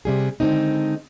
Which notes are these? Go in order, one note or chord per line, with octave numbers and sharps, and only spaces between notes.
C3 G3 G#4
D3 D#3 F3 G#3 C4 D#4